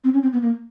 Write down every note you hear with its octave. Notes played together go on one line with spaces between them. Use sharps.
C4
C#4
C4
B3
A#3